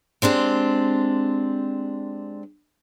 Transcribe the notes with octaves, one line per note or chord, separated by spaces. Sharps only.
G#3 C4 D4 G4